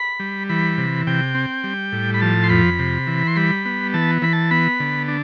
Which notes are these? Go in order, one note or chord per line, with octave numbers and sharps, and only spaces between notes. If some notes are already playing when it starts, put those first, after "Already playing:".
Already playing: B5
G3
E3 B5
C3
C3 G5
C4
G3
A2
B5
F3 A5
C6
F2 B5
C3
E3
C6
G3 B5
B3
E3 A5
E3 B5
A5
B3 B5
D3
D4